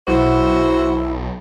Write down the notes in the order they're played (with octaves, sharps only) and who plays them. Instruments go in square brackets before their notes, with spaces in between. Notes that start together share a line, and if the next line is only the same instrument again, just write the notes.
[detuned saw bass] B1 [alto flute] E4 [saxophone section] F#4 C5